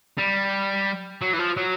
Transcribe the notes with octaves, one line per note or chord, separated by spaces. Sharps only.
G3
F#3
E3
F3
F#3